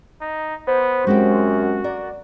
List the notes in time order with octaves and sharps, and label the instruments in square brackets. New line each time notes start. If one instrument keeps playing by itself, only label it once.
[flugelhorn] D#4
[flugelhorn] B3 [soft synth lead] C5
[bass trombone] F#2 [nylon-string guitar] G#3 C4 G4 [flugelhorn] F#4
[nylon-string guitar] A#4 [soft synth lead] D5